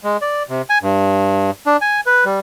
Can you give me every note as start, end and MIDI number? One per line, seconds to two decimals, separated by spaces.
0.04 0.17 56
0.22 0.43 74
0.49 0.62 48
0.70 0.78 80
0.82 1.51 43
1.66 1.77 62
1.81 2.01 80
2.06 2.25 71
2.25 2.40 55